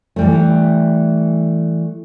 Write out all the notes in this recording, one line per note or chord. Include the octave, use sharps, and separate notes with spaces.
E3 G3 A3